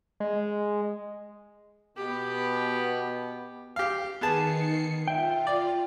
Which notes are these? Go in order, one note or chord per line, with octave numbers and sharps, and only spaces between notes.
G#3
B2 B3 G4
G4 F5
D#3 B3 G#4 A5 C7 C#7
F4 E5 G5
D5